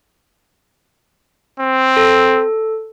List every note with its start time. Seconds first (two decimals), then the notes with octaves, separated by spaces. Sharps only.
1.60 C4
1.97 A4